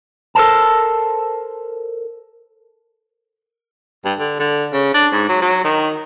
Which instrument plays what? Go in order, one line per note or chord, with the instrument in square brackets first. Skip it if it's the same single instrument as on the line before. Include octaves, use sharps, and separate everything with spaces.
[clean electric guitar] A4 A#4 C5 A5
[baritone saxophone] G2
D3
D3
C#3
D4
G#2
F#3
F#3
D#3